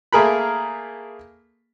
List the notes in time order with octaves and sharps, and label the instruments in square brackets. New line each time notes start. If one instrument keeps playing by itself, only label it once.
[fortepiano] A3 A#3 G#4 A#4 B5